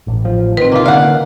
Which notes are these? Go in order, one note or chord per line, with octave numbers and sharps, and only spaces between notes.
A1
F3
D#3 C4 B4
C3 A#3 F4
D3 A#3 C#4 D5 F5 F#5